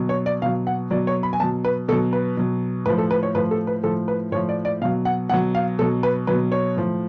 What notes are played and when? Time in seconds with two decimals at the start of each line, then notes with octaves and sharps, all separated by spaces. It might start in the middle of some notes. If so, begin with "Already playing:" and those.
Already playing: B2 F#3
0.09 C#5
0.26 D5
0.42 B2 F#3 F5
0.67 F#5
0.91 B2 F#3 D5
1.07 C#5
1.23 B5
1.33 G#5
1.40 B2 A5
1.43 F#3
1.65 B4
1.88 B2 A4
1.92 F#3
2.13 B4
2.37 B2 F#3
2.86 A2 F3 B4
2.98 A4
3.11 B4
3.23 C#5
3.35 A2 F3 B4
3.51 A4
3.67 B4
3.84 A2 F3 A4
4.08 B4
4.32 A2 F3 C#5
4.49 D5
4.65 D5
4.82 B2 F5
4.85 F#3
5.05 F#5
5.29 B2 F#3 F#5
5.55 F5
5.79 B2 A4
5.81 F#3
6.03 B4
6.27 B2 F#3 B4
6.52 C#5
6.77 A2 F3